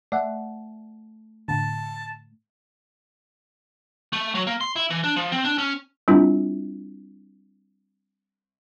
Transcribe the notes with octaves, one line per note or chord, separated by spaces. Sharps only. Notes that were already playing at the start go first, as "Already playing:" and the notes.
A3 D5 E5 F#5
A2 D3 A5
A3
F#3
A#3
C6
E4
E3
D4
F3
C4
D4
C#4
G3 C4 D4 E4 F4